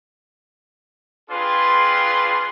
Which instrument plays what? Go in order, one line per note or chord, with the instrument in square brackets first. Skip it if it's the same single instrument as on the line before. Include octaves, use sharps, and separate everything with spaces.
[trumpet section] C4 D4 F4 G#4 B4 C6